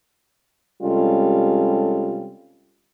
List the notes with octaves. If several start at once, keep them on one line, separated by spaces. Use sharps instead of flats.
C3 G3 G#3 C#4 F4 A4